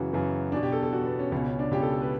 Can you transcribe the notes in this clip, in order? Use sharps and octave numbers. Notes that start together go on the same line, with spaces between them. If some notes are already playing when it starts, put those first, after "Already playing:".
Already playing: F#2 C#3 E3 F#4
F#2 C#3 E3
E2 B2 D4
G4
A4
A4
E2 B2 F#4
B3
C#4
C#2 B2 C#4
C#4
D4
C#2 B2 G4
A4
A4
B4